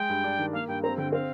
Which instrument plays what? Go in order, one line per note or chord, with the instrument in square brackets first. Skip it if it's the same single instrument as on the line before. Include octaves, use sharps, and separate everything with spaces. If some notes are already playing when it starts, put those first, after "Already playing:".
Already playing: [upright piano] G#3 [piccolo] G5
[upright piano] G2
D4
D#3
[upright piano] A#3 [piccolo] F5
[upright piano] G2 [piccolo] G5
[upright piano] C4 [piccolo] A#5
[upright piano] D3 [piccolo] G5
[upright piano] C4 [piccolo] F5